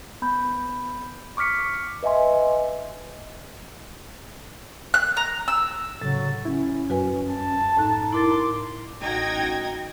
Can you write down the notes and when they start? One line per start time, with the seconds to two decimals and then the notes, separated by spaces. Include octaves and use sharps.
0.22 B3 B5 G6
1.37 C#6 D6 F6 B6 C#7
2.03 B4 D#5 E5 G#5 C6
4.94 F#6
5.17 A#5
5.48 E6
6.01 A2 C#3 F#3 A6
6.45 C#4 E4
6.90 F#2 F#4 B4 G#5
7.31 A5
7.77 A2 D#4 F#6
8.13 E4 A#4 C6 D6 A6
9.02 A1 D#4 F#4 G5 G#6 A#6